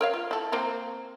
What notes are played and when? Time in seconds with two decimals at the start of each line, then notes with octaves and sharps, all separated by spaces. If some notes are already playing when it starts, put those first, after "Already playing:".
0.01 A#4 C#5 F5
0.13 F4
0.31 E4 A4
0.52 A#3 C4 A#4